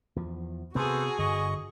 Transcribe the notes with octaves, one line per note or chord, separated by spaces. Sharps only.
E2 F3
C3 B3 F#4 G#4 A4 B4 C5
G1 D3 D#5 C#6